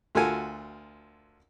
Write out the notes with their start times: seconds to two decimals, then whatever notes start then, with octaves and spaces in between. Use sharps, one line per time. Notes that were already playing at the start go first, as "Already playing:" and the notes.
0.15 D2 F4 F#4 A4 A#4 G#5